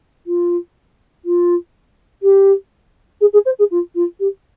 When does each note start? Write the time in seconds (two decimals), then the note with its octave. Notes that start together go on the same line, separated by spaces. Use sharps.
0.26 F4
1.25 F4
2.23 G4
3.21 G#4
3.33 G#4
3.45 C5
3.59 G#4
3.71 F4
3.95 F4
4.20 G4